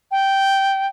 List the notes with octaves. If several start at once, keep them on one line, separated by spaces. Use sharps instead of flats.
G5